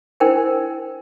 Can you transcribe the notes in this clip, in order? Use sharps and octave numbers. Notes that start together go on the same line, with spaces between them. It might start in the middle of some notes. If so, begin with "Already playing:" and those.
D4 E4 A#4 C5 G5 G#5